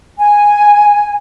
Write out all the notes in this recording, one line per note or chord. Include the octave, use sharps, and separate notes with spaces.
G#5